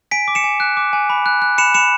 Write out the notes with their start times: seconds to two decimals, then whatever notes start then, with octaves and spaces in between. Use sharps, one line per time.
0.11 G#5 B6 D7
0.28 D6
0.35 C#7 E7
0.44 G#5
0.60 F#6
0.77 D6
0.93 G#5
1.10 B5
1.26 F#6
1.42 F#6
1.58 B5 C#7 E7
1.74 B5 C#7 E7